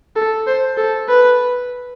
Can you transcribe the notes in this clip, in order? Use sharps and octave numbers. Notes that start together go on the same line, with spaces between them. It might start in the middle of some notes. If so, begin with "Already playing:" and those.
A4
C5
A4
B4